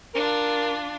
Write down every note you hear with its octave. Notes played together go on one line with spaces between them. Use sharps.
D4 F4 A#4